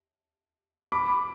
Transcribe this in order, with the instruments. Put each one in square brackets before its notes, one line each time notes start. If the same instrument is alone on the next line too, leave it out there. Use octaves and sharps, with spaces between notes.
[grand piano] B5 D6